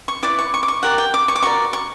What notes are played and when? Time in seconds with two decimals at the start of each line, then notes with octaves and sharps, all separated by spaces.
0.08 C#6
0.23 E4 B4 D5 D6
0.39 C#6
0.54 C#6
0.63 D6
0.68 C#6
0.83 G4 A#4 D5 F#5
0.98 G5
1.14 D6
1.28 C#6
1.36 D6
1.43 F#4 A#4 D5 C#6
1.73 C#6